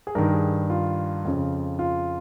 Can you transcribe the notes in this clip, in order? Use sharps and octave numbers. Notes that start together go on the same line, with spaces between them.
G#4
G2 D#3 A#4
G#4
F4
F2 C#3
F4